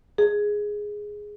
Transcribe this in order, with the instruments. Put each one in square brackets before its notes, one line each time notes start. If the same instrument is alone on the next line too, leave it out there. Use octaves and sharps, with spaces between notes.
[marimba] G#4